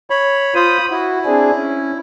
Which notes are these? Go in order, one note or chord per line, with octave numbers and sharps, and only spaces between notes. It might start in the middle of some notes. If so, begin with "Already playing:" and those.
C#5 B5
F4 C5 B5 D#6
E4 F#4
C4 D4 G#4
C#4